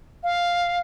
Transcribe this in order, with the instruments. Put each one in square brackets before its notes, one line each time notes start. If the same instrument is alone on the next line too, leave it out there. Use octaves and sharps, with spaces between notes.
[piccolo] F5